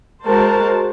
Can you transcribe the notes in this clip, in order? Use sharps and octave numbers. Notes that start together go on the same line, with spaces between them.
G#3 F#4 A#4 C5 A5